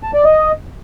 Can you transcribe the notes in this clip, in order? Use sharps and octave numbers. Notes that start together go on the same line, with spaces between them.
A5
D5
D#5